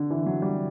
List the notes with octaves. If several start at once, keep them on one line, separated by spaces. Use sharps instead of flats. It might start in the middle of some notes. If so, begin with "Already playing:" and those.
Already playing: D3
E3
F#3
G3